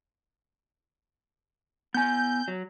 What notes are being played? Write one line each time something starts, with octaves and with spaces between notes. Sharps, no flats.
B3 G#5 G6
F#3